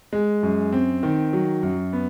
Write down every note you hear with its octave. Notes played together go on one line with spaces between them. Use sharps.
G#3
F#2
C4
D#3
F#3
F#2
B3